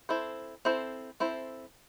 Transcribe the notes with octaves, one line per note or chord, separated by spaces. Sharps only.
C4 E4 A4 C5
C4 E4 A4 C5
C4 E4 A4 C5